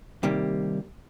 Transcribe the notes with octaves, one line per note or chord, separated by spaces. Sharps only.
C3 D#3 G3 A#3